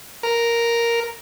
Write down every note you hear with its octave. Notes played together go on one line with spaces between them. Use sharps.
A#4